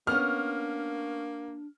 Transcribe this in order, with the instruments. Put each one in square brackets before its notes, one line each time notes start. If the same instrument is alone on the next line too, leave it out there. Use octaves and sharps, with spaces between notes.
[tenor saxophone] A#3 [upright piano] B3 C#4 [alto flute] D4 [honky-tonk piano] F6